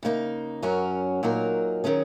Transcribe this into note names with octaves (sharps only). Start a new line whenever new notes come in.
C#3 A#3 D#4
F#2 F#3 C#4 F#4 A#4
A#2 F#3 D#4 F#4 A#4
D#3 F#3 C#4 G#4